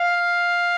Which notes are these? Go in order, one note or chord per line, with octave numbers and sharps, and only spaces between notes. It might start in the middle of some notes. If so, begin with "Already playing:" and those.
Already playing: F5